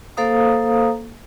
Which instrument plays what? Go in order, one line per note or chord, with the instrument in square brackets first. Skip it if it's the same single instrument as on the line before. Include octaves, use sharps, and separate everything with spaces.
[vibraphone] A#3 A4 C5 F5 A#5 D#6